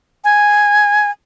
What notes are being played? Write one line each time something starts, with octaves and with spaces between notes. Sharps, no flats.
G#5